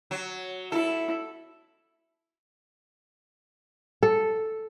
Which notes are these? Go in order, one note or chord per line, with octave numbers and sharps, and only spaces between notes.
F#3
E4 A4
A4